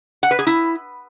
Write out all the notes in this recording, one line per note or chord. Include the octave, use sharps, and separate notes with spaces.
F#5
B4
G#4
E4